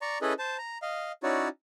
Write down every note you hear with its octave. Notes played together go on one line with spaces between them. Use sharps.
D5 A#5 C#6
C#4 E4 G#4 A4 B4 D#5
C5 A5
A#5
D#5 F5
C#4 D#4 E4 F#4 C#5 D5